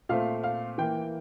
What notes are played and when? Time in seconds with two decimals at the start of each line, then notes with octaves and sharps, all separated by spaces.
0.09 A#2 A3 C4 F5
0.44 F5
0.78 E3 A#3 G5